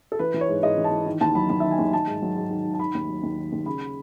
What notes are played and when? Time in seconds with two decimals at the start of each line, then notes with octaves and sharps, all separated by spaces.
0.12 A4
0.19 E3 B4
0.34 E3
0.41 C#5
0.48 G#2
0.63 G#2 D#5
0.77 E3
0.84 A5
0.91 E3
1.06 D#3
1.21 D#2 A5
1.35 F#3 B5
1.50 D#2 B5
1.60 D#3 E5
1.71 G#5
1.78 D#2
1.93 D#3 A5
2.07 G#2
2.22 F#3
2.36 G#2
2.51 D#3
2.65 G#2
2.74 A5
2.79 D#3 B5
2.94 D#2
3.09 F#3
3.23 D#2
3.37 D#3
3.52 D#2
3.66 C#3 B5